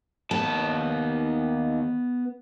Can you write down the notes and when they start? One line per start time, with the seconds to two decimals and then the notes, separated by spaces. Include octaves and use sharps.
0.31 D#2 B3 A5